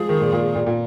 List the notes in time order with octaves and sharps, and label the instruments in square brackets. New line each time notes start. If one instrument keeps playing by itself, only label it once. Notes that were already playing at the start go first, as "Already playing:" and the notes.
Already playing: [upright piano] F3 G#3 [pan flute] G#4
[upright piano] D#3
A#2
A#2
A#2
A#2